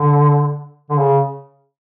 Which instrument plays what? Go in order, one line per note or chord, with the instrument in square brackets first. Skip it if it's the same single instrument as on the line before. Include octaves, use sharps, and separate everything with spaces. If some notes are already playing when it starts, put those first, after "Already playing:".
Already playing: [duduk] D3
D3
C#3